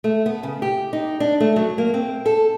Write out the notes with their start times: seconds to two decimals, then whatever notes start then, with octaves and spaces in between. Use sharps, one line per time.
0.04 A3
0.26 B3
0.43 C#3
0.62 G4
0.93 D#4
1.20 D4
1.40 A3
1.56 F#3
1.78 A#3
1.94 C4
2.26 A4